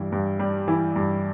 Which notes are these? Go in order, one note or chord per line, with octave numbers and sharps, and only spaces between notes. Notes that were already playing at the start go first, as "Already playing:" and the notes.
Already playing: G2 E3
G2
G3
E3
G2